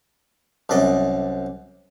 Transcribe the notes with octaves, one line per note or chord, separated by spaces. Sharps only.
C2 F#2 D5 D#5